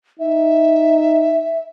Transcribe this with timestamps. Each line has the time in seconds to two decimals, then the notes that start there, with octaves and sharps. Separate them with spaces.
0.19 D#4 E5